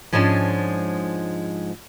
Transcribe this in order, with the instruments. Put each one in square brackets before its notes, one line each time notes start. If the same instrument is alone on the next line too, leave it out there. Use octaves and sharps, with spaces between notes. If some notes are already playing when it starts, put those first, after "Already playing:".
[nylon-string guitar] G#2 F3 G#3 C#4 D4 A5